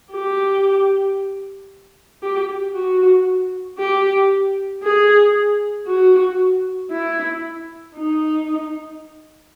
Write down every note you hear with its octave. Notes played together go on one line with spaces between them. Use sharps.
G4
G4
F#4
G4
G#4
F#4
E4
D#4